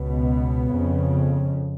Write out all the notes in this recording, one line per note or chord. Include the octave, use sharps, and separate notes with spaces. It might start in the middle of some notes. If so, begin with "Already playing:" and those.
Already playing: C#2 B2 B3
F2 C#3